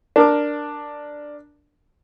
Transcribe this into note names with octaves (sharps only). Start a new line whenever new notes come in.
D4 A#4 D6